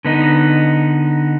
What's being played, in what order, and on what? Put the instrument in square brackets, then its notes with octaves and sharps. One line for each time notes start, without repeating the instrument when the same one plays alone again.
[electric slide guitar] D3 B3 D#4